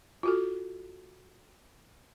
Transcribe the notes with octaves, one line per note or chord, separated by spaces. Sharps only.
F4 F#4 A4